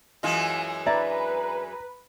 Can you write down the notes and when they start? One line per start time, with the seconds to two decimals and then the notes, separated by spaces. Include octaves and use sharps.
0.23 F#2 E3 G#3 F4 D#5
0.87 D4 E4 B4 D5 A#5